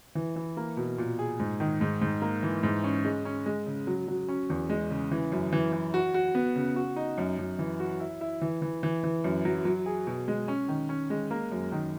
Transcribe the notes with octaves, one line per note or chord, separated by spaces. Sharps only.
E3
E3
A#3
B2
A#2
G#4
G#2
D#3
G#2
G#2
A#3
E3
G#2
C#4
G#3
C#4
G#3
C#3
F#3
F#3
C#4
E2
G#3
C#3
E3
F#2
E3
E3
F#4
F#4
B3
C#3
F#4
D#4
F#2
F#2
E3
F#4
E4
E4
E3
E3
E3
E3
F#2
F#3
F#3
G#4
B2
G#3
C#4
D#3
C#4
G#3
A#3
F#2
D#3